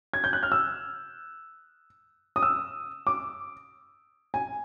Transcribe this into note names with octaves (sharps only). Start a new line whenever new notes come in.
G#6
G6
F#6
F6
E6
D#6
E6
D6
G#5